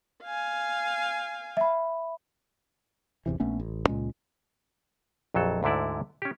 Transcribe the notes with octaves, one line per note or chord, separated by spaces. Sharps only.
F5 G#5
E5 B5
G#1 E2 C3 E3
A#1 A3 B3 C#4
A1
C#2 A#2 G#3 C#4
A#1 F2 F#3 A4
D2 G#2 D3 E4 D5
C#4 G4